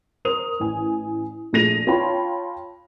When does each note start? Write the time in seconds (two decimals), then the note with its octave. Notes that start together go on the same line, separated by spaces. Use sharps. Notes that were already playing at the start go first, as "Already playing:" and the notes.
0.25 A#4 C5 D#6 F7
0.60 A1 G#5
1.53 A#1 A3 G#4 A#6 D#7 F7
1.87 F4 C#5 G5 A5 B5 C6